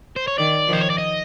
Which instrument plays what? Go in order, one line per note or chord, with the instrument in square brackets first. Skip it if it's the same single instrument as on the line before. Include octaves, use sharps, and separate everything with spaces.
[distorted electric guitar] C5
C#5
[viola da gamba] D#3 [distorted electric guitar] D5
[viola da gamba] D#3 F3
[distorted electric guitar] C5
C#5
D5
D#5